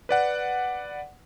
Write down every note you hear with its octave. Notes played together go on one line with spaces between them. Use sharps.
B4 D5 F#5